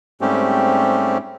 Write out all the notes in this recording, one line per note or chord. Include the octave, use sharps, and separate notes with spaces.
G#2 G3 A3 C4 C#4 G4